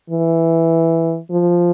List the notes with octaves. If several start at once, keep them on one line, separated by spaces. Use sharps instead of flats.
E3
F3